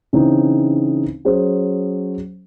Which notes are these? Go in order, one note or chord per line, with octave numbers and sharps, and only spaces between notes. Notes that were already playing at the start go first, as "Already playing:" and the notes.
C#3 E3 C4 D#4
F#3 C#4 G#4 C5